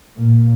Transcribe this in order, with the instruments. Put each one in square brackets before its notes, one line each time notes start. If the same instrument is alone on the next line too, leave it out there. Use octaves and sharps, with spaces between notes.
[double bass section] A#2